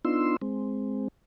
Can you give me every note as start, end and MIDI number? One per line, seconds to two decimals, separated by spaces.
0.05 0.37 59
0.05 0.37 62
0.05 0.37 63
0.05 0.37 65
0.05 0.37 84
0.05 0.37 88
0.42 1.08 56
0.42 1.08 60